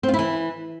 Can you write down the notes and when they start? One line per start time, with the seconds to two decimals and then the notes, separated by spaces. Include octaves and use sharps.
0.03 C4
0.08 F4
0.14 E4
0.19 E3